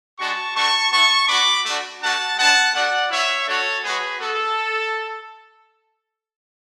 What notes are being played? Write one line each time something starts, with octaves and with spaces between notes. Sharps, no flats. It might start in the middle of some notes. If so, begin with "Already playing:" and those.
G#3 D4 F#4 A5 C#6
A3 D4 F#4 A5 C#6
B3 E4 A5 C#6
B3 D4 F#4 B5 D6
A3 D4 F#4
A3 D4 F#4 F#5 A5
G#3 B3 D4 F#5 A5
A3 D4 F#4 D5 F#5
B3 E4 C#5 E5
A3 D4 F#4 A4 C#5
G#3 B3 F#4 G#4 B4
B3 F#4 A4